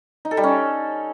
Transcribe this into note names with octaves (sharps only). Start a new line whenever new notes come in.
D#4
A4
G3
C#4